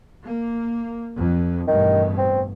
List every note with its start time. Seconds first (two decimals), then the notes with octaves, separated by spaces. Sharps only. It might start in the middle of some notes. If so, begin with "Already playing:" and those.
0.25 A#3
1.15 F2
1.68 A1 G2 B2 D#3
2.18 C4